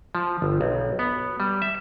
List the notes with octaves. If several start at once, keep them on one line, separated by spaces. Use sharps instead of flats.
F3
G1
B1
B3
G3
E5